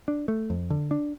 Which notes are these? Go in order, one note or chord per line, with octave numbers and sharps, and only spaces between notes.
D4
A3
F2
D3
D4